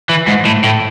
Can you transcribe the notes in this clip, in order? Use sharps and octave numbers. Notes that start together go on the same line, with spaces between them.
E3
G#2
A2
A2